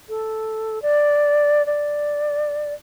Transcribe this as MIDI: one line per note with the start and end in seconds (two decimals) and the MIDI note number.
0.09 0.81 69
0.82 1.65 74
1.66 2.73 74